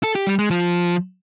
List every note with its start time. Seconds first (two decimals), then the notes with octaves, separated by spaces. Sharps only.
0.03 A4
0.15 G4
0.27 G3
0.39 G#3
0.50 F3